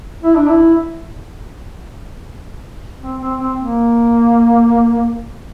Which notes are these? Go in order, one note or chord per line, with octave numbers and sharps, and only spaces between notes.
E4
D4
E4
C4
C4
C4
A#3